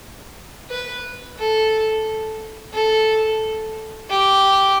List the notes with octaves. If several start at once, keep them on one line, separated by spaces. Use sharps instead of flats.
B4
A4
A4
G4